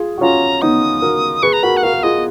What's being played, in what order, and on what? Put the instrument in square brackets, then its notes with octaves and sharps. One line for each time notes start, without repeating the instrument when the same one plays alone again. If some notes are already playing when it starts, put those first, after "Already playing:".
Already playing: [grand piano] F4 G#4
F#4
[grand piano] C#4 F4 [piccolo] A#5
[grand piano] B3 D#4 [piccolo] D#6
[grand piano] F#4 A#4
[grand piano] G#4 B4 [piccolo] C#6
[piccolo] A#5
[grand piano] F#4 A#4 [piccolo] B5
[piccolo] F#5
[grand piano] F#4 A#4 [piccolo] F5
[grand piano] A#4
[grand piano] F4 G#4 [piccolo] D#5